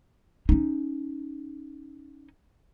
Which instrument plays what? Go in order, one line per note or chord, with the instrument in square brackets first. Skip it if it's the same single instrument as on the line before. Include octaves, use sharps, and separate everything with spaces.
[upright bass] C#4 D#4